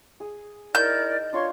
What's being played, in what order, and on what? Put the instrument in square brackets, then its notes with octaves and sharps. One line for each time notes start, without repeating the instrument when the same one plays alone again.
[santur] G#4
[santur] D#4 [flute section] E4 A#4 D5 [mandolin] G6
[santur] D4 F4 C#6 [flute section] C#5 C6